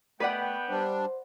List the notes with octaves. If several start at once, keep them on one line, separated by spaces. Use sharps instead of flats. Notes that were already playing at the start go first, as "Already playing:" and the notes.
A3 B3 B4 D5 F#5 G5
G3 D4 C5